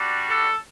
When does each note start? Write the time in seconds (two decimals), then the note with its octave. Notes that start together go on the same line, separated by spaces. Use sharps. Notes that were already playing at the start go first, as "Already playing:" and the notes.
Already playing: G3 D4 F#4
0.29 A4